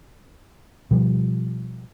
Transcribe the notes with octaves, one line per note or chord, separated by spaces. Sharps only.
B2 F3 G3